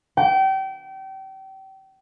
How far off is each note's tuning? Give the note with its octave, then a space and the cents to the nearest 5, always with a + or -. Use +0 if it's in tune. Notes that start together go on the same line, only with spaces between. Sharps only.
G5 -30